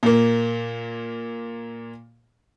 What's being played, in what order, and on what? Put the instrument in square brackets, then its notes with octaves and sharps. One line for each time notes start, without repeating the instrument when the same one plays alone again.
[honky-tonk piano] A#2 A#3